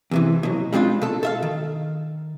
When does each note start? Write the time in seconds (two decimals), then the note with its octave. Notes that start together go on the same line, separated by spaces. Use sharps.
0.11 E2 C3 E3
0.43 B2 F#3
0.73 G3 G#3 C4 D4 F4
1.02 B2 A4
1.23 A4 E5 F5
1.42 D#3